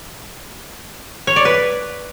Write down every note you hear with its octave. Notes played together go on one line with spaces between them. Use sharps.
C#5
D5
B4